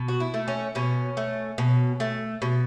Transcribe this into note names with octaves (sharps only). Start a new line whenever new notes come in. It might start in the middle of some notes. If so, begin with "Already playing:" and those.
Already playing: B2
F#4
E4
A3
C#4
B2 C#4
A3
B2
A3
B2